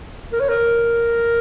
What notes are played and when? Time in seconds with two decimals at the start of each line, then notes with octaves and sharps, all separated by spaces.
0.32 A#4
0.40 C#5
0.49 A#4